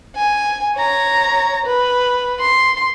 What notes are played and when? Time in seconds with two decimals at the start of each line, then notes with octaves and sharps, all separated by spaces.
0.16 G#5
0.77 C#5 A#5
1.66 B4
2.40 C6